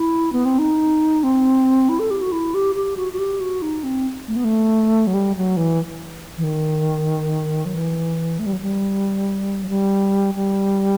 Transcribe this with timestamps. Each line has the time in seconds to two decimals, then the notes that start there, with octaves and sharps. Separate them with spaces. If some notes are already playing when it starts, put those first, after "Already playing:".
Already playing: E4
0.33 B3
0.45 C4
0.59 D#4
1.24 C4
1.89 E4
1.99 A4
2.11 G4
2.21 F#4
2.32 E4
2.54 G4
2.75 G4
2.97 F#4
3.13 F#4
3.19 G4
3.40 F#4
3.62 D#4
3.84 C4
4.28 A3
4.36 B3
4.44 A3
5.07 F#3
5.14 G3
5.36 F#3
5.57 E3
6.38 E3
6.44 D#3
7.65 F#3
7.75 E3
8.39 A3
8.46 G3
8.53 F#3
8.61 G3
9.64 F#3
9.69 G3
10.35 G3